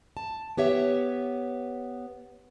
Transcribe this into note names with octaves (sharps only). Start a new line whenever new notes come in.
A5
B3 G4 C#5 E5